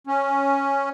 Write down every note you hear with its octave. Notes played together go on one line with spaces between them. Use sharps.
C#4